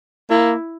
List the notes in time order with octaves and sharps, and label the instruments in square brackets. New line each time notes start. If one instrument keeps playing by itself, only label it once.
[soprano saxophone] A#3 [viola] E4